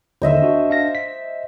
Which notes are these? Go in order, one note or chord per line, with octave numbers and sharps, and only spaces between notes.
D#2 D3 D#3 C5 D#5 E5
D4 F#4
D4 F5 A#6
B6